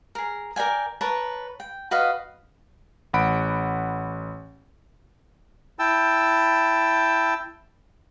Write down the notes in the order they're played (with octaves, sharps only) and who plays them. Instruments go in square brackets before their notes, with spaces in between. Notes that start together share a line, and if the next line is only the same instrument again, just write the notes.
[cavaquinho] G#4 A#4
A#4 D5 G5 G#5
A#4 B4 C#5 A5
G5
F#4 B4 D#5 F5
[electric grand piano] A1 F#5 B5 D7
[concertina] E4 G5 A5 E6